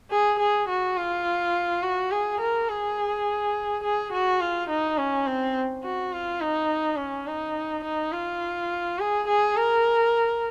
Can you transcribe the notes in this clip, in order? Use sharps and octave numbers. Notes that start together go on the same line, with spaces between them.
G#4
G#4
F#4
F4
F#4
G#4
A#4
G#4
G#4
F#4
F4
D#4
C#4
C4
F#4
F4
D#4
C#4
D#4
D#4
F4
G#4
G#4
A#4